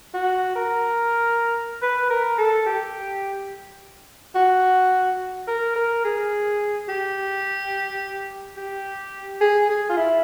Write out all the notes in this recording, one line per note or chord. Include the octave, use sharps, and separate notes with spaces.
F#4
A#4
B4
A#4
A4
G4
F#4
A#4
A#4
G#4
G4
G4
G#4
G#4
F4
E4